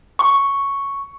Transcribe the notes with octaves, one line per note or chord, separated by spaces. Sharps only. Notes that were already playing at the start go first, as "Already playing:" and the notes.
C#6